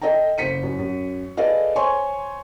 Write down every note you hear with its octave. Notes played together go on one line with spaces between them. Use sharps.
A4 D#5 E5 G5 A#5
F#1 C5 B6 C#7 D#7
F#2
F#2
G#4 A4 B4 D5 D#5 F5
C5 C#5 G#5 C6 C#6